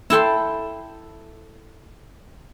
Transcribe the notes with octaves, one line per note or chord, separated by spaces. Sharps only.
E4 A4 G5 C6